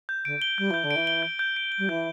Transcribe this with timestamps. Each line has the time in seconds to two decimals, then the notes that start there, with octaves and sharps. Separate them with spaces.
0.09 G6
0.25 D3 D7
0.42 G7
0.58 G3 G6
0.70 E3 G6
0.83 D3
0.91 E3 D7
1.07 G7
1.23 G6
1.39 G6
1.56 D7
1.72 G7
1.78 G3
1.88 E3 G6